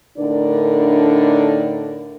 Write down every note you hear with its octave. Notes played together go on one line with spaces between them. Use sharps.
A2 D3 D4 D#4 A#4 D5